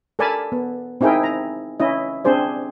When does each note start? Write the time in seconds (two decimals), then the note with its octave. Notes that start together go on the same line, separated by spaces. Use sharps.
0.19 A4 A#4 D5 G#5 A5 B5
0.52 B3
1.01 C4 D#4 E4 G#4 A#4 G5
1.23 A#5
1.80 C#4 E4 D#5
2.25 C4 D4 G#4 C5 D5